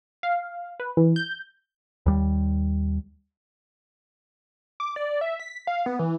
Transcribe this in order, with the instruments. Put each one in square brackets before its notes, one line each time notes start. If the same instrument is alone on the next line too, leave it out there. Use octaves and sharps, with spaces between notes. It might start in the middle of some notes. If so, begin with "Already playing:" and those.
[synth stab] F5
B4
E3
G6
[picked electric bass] D#2 G3
[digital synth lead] D6
D5
E5
B6
F5
B3
E3